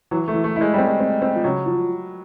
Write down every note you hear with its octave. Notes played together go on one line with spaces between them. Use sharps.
E3 F#3
A3
E3
A3
G#3 E4
G3 C4
G#3
C4
C4
F3
C#3 F#3
F3